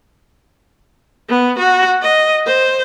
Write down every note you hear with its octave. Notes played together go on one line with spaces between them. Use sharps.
B3
F#4
D#5
C5